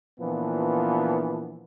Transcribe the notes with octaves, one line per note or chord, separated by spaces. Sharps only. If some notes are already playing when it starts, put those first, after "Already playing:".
A#2 E3 F3 B3 D4